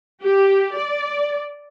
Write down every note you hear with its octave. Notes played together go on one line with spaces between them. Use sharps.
G4
D5